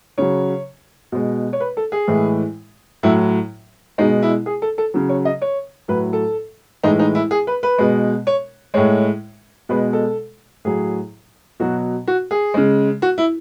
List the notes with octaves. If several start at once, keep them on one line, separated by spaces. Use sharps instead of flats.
C#3 F#3 C#5
B2 G#3
C#5
B4
A4
G#4
A2 E3 G#3
A2 F#3 E4
B2 G#3 D#4
E4
G#4
A4
A4
C#3 F#3
C#5
D#5
C#5
A2 F#3 B4
A4
A2 E3 G#3 D#4
D#4
E4
G#4
B4
B4
B2 G#3
C#5
A2 G#3 C#5
B2 G#3 B4
A4
A2 F#3 G#4
B2 F#3 F#4
F#4
G#4
C#3 G#3
F#4
E4